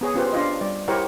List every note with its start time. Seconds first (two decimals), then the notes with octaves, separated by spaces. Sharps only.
0.01 B3 G#4 C#5
0.14 B3 C#4 F4 G4 B4 C5
0.32 D4 F4 D#5
0.61 G3 D5
0.88 E4 G4 A#4 C5 C#5 F#5